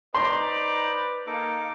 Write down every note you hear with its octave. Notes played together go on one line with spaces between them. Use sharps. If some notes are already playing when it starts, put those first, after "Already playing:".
D#4 B4 C5 D5 A#5 C6
A#3 D#4 A4 D6